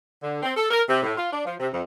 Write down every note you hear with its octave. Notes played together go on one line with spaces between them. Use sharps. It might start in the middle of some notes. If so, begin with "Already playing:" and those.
D3
C4
A4
A#4
C3
A2
F4
D4
F3
C3
F2